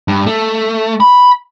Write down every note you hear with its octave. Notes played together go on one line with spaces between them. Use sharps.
G2
A3
B5